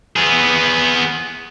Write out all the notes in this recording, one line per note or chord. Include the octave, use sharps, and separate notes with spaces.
B3 G#4